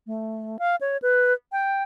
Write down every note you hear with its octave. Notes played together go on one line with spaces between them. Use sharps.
A3
F5
C#5
B4
G5